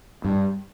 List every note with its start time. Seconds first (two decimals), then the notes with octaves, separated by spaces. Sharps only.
0.24 G2